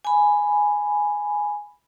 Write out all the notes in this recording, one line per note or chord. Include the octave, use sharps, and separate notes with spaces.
G#5 B5